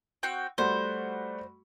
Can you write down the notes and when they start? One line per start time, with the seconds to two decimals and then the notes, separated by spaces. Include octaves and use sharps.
0.23 C4 F#4 G5
0.58 G3 A3 F#4 C5